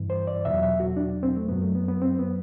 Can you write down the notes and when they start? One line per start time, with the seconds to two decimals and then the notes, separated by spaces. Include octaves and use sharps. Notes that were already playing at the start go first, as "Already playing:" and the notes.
Already playing: G2 E3
0.10 C5
0.27 D5
0.45 E2 B2 F#3 E5
0.63 E5
0.80 F#4
0.97 D4
1.23 C4
1.37 A3
1.49 F#2 F#3 B3
1.62 A3
1.75 B3
1.88 B3
2.02 C4
2.19 B3